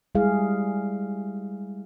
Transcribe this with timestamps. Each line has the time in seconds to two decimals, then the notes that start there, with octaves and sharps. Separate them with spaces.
0.15 G3 G#3 E4 G#4 F5